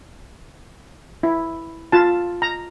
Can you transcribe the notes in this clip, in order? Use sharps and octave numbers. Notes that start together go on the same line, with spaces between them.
E4
F4 A5
A#5